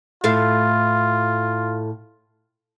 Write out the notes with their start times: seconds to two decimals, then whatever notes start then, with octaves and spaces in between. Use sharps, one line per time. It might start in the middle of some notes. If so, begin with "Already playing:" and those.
0.24 A2 F4 A4 F5